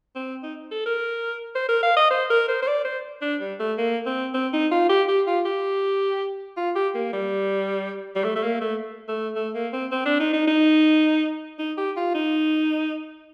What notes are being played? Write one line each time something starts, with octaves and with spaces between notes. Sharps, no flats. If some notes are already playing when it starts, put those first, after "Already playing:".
C4
D#4
A4
A#4
C5
A#4
F5
D#5
C5
A#4
C5
C5
D5
C5
D4
G3
A3
A#3
C4
C4
D#4
F4
G4
G4
F4
G4
F4
G4
A#3
G3
G3
A3
A3
A#3
A3
A3
A3
A#3
C4
C4
D4
D#4
D#4
D#4
D#4
G4
F4
D#4